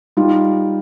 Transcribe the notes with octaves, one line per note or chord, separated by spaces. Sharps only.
G3 D#4 F4